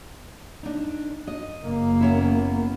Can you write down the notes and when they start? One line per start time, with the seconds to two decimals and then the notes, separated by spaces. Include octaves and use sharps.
0.63 D4 D#4
1.27 D#5
1.63 F#1 A#3
2.01 B3 C#4 E4